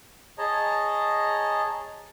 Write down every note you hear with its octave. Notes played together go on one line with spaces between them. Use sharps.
G#4 C#5 D#5 A5 A#5